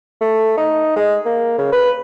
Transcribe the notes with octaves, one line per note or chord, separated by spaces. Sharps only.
A3
D#4
G#3
A#3
C#3
B4